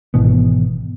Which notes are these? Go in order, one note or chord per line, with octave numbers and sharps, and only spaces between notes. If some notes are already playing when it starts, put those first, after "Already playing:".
G#1 B2 E3 B3